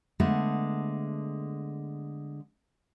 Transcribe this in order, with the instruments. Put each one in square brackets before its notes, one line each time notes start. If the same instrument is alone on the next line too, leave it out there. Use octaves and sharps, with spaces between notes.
[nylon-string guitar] D3 G#3 A3 B3